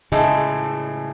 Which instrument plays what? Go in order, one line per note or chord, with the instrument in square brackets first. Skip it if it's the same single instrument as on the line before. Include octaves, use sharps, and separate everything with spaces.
[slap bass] A2 C#3 [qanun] G#3 A3